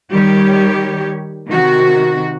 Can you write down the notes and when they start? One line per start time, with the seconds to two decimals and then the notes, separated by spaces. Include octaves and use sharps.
0.12 D#3 G3 G4 C#5
1.49 C3 D#3 F#4